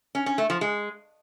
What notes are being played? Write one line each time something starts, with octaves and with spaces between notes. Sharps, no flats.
C#4
C#4
A3
F3
G#3